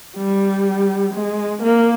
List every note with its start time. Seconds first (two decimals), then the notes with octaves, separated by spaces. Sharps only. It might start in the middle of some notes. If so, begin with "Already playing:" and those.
0.17 G3
1.14 G#3
1.63 A#3